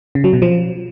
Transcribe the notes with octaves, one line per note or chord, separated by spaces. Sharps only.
C#3
F#3
B2
F3